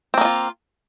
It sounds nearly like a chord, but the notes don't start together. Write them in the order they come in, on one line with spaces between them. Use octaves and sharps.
C4 A#3 D#4 F4